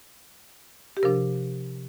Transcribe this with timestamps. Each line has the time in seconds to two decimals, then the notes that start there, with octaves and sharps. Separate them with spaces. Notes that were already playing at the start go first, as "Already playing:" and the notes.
0.97 G4
1.03 C3 F3 D4 A#4